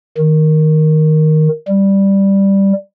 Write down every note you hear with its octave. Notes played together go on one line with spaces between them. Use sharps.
D#3
G3